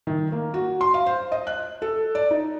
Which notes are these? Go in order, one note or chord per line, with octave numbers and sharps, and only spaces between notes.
D#3
A#3
F#4
C6
F5
C5
D#5
F#6
A4
D5
D#4